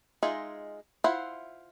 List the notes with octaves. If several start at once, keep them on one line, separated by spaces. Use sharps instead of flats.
G#3 D#4 F4 G#4 E5
E4 F4 C5 E5 F#5